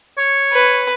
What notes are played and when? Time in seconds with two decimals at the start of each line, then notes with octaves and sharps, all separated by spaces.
0.17 C#5
0.53 B4